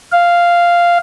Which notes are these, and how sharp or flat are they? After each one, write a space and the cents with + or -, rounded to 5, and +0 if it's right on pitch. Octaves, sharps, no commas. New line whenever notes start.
F5 -5